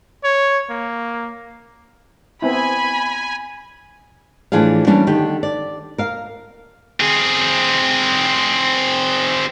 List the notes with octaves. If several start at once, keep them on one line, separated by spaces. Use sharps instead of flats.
C#5
A#3
B3 C4 E4 G#5 B5
A2 E3 F3 D4 G#4 F5
E3 G3 A#3 C#4 D4
D3 D#3 G4
D5
A#4 F5
C4 G#4